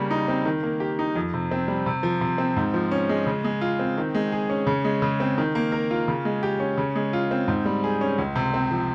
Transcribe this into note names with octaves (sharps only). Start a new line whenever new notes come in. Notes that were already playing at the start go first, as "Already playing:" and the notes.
Already playing: C#3 G3 A#3
D#4
C4
D#3
A#3
G4
D#4
F2
C3
C4
G3
C3
F3
C3
C4
G#2
F3
C#4
G#3
C#3
G#3
F4
C4
D#3
G#3
G#4
C#4
C#3
G#3
C#3
C4
D#3
A#3
A#4
F4
C#3
G#3
G4
C#4
C#3
G#3
F4
C4
G#2
G3
G#4
C#4
C#2
C3
C4
F3